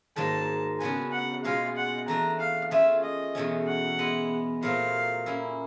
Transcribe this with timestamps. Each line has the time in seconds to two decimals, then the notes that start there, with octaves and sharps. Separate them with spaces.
0.16 G#2 D#3 F#3 A#3 D#4 A5
0.80 C#3 F#3 B3 D4 F#4 G#5
1.12 F#5
1.44 B2 G#3 C#4 F4 F5
1.76 F#5
2.08 E3 A3 D4 A#5
2.40 F5
2.71 A3 C#4 F4 G#4 E5
3.03 D#5
3.35 E2 B2 F#3 A3 C#4
3.68 F#5
3.99 G#3 B3 E4
4.62 A#2 F#3 A3 C4 F4 F5
5.26 A#3 C#4 E4